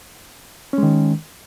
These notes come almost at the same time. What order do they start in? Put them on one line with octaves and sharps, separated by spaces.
C#4 G#3 D#3